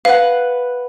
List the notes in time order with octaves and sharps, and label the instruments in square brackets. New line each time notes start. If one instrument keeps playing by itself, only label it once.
[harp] B4 F#5 [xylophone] F5